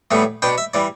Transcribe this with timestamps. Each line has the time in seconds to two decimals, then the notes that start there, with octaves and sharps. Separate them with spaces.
0.11 A2 E3 G3 B3
0.42 B2 B3 D4 G5
0.58 E5
0.74 E3 G3 D5